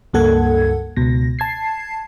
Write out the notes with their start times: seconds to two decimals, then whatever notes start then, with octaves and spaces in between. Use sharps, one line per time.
0.13 C#2 G2 A#3 A4 F#5 G#6
0.97 C#2 B2 A#6
1.39 A5 G#6 C7